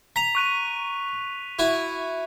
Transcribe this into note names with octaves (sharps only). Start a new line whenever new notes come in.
A#5 B6 F7
C#6 F#6 D#7
E4 F#4